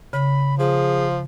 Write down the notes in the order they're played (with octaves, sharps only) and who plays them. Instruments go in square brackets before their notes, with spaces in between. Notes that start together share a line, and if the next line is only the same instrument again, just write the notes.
[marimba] C#3 [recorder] B5
[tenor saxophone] F3 [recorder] G#4